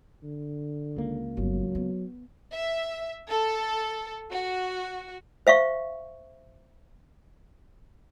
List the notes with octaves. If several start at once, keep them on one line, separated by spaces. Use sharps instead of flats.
D3
C#2 A#3
G1 F#3
B3
E5
A4
F#4
C5 E5 F5 C#6